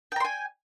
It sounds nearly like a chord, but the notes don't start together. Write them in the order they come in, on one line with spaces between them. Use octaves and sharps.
G5 A#5 C6 G#5